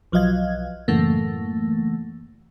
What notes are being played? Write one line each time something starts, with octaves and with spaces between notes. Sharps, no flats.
B1 F3 F#3 D#5 F5 G#6
F#2 A2 C#3 E3 A3 A#3